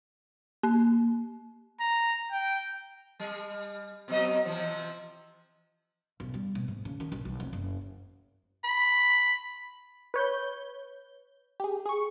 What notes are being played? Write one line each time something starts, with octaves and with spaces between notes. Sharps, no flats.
A#3
A#5
G5
G3
B2 F#3 D#5
C3 E3 F3
B1
G3
B2
G#2
C#3
D#3
B1
B1
F1
F#1
B5
B4 C#5 G6
G4 G#4
G#4 C#6